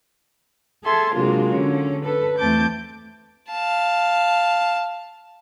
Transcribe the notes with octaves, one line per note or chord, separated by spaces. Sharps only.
G#4 A4 E5 A5 C6
C3 F#3 G#3 A#3 D4 F4
D3 C#4
A4 B4
E2 A3 C4 A5 D6 G6
F5 A5